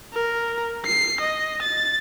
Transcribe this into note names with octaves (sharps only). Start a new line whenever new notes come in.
A#4
C7
D#5
A6